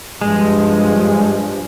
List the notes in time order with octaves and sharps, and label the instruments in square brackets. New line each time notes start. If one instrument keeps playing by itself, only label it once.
[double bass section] G2 F3 [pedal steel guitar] G#3